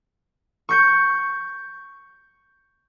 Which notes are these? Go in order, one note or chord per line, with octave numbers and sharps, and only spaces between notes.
C#6 G6 C#7